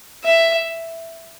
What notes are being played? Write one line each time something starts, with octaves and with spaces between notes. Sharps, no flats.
E5